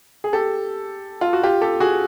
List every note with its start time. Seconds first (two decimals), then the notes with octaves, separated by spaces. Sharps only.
0.24 G#4
0.33 G4 A4
1.21 F4
1.33 F#4
1.43 F4 G4
1.61 G4 A4
1.80 F#4 G#4